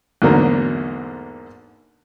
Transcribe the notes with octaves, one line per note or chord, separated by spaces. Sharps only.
E2 G#2 D3 F#3 A3 A#3